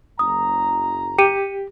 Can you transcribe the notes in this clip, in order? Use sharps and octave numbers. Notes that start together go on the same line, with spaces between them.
F#1 A#5 D#6
G4 C#7 D#7